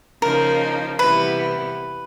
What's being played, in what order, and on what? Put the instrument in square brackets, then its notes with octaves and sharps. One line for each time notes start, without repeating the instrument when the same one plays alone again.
[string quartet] C#3 F3 A#3 D#4 [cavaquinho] A#4
[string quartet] C3 E3 G3 B3 E4 [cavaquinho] B4